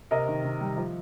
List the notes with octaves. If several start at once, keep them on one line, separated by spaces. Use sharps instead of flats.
C3 A#4 D#5
D#3
D#3
G3
F3